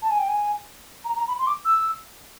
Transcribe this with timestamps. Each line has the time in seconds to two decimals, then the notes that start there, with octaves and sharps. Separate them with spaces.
0.02 A5
0.10 G#5
0.19 G5
0.28 G#5
1.04 A#5
1.16 A#5
1.28 B5
1.39 C6
1.47 D6
1.65 E6